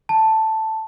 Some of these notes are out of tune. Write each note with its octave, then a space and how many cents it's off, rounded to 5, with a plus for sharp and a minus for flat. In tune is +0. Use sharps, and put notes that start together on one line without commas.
A5 +5